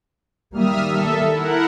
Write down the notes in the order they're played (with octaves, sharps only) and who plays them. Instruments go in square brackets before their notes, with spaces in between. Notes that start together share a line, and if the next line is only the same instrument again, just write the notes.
[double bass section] D#3 G3 A#3 [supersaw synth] E5 D#6 F6
[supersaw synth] A4 E5
E4 A#4 F#5